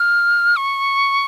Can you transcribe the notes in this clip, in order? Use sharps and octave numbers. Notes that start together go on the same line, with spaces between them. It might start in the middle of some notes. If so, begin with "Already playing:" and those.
Already playing: F6
C#6